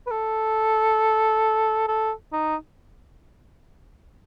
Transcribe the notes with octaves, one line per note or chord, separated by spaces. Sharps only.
B4
A4
A4
D#4